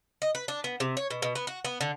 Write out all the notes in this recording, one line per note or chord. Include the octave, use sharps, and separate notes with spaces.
D#5
B4
D4
B3
C3
C#5
B2
B2
B3
F#4
B3
D3